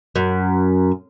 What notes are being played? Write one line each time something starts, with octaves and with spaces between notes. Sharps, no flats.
F#2